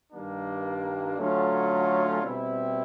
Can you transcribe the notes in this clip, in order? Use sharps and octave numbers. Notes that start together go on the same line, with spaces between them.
G2 D#3 G3 A#3 D4
D3 F#3 A3 C#4 F4
B2 G3 C4 E4